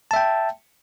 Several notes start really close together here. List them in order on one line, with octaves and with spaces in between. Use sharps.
A5 E5 G5